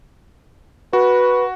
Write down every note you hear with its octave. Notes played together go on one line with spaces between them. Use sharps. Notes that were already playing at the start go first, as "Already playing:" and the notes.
F#4 B4